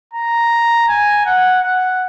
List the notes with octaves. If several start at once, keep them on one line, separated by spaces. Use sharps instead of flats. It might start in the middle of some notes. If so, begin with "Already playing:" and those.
A#5
G#5
F#5
F#5